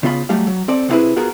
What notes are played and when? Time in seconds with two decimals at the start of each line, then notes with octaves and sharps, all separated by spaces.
0.03 C#3 B3 F4 F5 B5
0.29 F#3 G3 A3 G4 F5
0.47 F#3
0.68 C4 A4 D5
0.89 C3 B3 C4 E4 G#4 B4
1.16 B3 F4 F#4 G#4 A#4